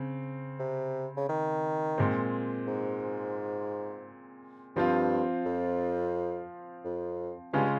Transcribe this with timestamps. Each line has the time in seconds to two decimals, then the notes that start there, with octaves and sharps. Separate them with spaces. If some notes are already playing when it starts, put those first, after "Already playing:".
Already playing: C#3 C4
0.59 C3
1.17 C#3
1.29 D#3
1.98 A#2 G#3 C4
2.67 G#2
4.76 G2 F3 C4 F4
5.46 F2
6.84 F2
7.53 G2 C#3 G#3 C#4 F4